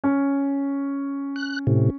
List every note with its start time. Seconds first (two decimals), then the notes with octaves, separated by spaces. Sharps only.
0.04 C#4
1.36 F#6
1.67 A2 C3